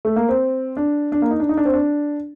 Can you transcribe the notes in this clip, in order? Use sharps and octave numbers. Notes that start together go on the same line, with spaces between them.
A3
A#3
C4
D4
D4
A#3
D#4
D4
D#4
D4
C4
D4